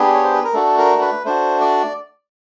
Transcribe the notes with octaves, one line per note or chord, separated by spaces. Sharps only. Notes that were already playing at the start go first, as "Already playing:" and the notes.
Already playing: B3 D4 G4 G#4
C#5
C5
B4
A#4
A3 D4 F#4 A4
A#4
B4
A3 D4 F#4 C5
D5